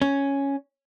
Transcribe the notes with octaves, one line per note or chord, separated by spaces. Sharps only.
C#4